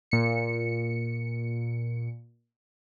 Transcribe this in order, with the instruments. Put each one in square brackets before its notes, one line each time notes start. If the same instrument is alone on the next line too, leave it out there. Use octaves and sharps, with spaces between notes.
[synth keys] A#2 C#7